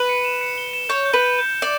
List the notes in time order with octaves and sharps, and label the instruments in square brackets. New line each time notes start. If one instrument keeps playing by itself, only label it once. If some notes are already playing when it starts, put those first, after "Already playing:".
Already playing: [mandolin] B4
[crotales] C#7
E7
C#7
G7
E7
[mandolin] C#5 [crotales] G6
[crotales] G6
[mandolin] B4
[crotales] G6
G6
G6
[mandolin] D5